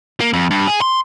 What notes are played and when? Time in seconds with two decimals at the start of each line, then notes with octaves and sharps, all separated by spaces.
0.20 A#3
0.33 F2
0.51 G2
0.67 G#4
0.81 C6